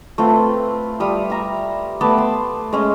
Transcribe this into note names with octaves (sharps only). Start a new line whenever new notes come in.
A3 C4 F4 B4
G3 F4 D#6
E5 A#5
A3 B3 A5 D6
C6
G#3 C#4 D#5